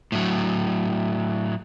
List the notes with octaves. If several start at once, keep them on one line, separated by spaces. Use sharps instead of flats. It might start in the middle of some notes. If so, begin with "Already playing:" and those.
A2 F#3